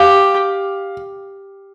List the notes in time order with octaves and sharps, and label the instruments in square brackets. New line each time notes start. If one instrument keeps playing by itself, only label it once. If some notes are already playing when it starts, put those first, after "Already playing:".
Already playing: [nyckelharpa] G4 [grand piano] F5